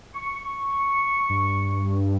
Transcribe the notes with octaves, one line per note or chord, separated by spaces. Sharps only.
C#6
G2